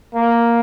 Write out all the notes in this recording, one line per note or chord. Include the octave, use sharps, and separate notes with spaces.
A#3